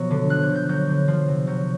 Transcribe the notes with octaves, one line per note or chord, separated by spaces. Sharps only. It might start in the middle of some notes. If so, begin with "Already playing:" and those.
Already playing: B2 F3 F#3 B3
D3
F3 F#6
G6
D3
G6
F#3 G6
D3
F3
C3
F#3 G6